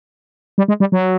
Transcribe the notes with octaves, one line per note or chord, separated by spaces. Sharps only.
G3
G#3
G3
F#3